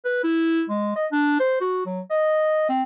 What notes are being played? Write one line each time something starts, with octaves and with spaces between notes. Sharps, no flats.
B4
E4
G#3
D#5
D4
C5
F#4
F#3
D#5
C4